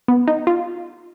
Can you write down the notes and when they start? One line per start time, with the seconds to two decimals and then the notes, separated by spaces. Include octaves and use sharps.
0.08 B3
0.28 D#4
0.47 F4